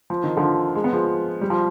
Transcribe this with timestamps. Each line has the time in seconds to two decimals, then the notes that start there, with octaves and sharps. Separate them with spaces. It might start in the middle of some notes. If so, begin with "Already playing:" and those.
0.10 F3
0.24 D#3
0.37 D3 F3
0.75 G#3
0.84 B3
0.93 F3 G#3
1.41 G3
1.50 F3